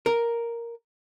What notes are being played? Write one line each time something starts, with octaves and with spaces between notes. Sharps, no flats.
A#4